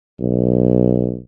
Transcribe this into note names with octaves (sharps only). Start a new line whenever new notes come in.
B1